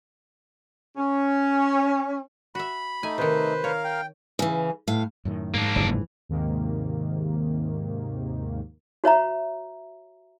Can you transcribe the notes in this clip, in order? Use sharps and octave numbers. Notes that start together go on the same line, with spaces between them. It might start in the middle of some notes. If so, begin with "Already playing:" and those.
C#4
F#4 E5 B5
A3 D#4 G#5
C3 D#3 B4 C5
A#4 C#5 F5
G5
C#3 E3
A2 F5
F#2 A2 D#3
G#2 A#3 D4
F#1 F2 C3 E3
D#2 G#2 C3 D#3 A#3
F#4 C#5 E5 A#5